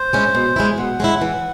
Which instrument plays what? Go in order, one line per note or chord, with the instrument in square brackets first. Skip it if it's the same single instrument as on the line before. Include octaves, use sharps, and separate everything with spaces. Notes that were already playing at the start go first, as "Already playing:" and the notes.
Already playing: [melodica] C5
[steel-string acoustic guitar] G#3 C#4 E4
B2
G#3 C#4 E4
[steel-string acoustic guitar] B2 [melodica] F#5
[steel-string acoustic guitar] G#3 C#4 E4
E3